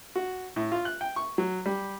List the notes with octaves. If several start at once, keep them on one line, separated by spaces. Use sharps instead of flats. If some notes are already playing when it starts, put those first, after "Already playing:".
F#4
A2
F4
F#6
G5
C#6
F#3
G3